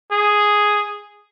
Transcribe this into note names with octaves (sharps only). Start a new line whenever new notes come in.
G#4